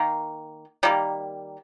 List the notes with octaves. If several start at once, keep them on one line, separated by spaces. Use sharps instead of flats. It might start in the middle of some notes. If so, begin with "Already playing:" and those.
Already playing: D#3 A#3
D#3 G3 A#3